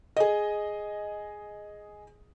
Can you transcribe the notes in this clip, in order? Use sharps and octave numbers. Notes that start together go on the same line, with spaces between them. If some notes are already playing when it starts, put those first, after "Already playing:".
G#4 D#5